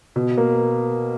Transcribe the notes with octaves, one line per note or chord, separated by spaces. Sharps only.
B2
A#3